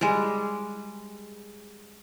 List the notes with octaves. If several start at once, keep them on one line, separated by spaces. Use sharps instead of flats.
G3 G#3